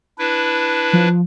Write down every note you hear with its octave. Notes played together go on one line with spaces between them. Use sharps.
D4 E4 B4
F3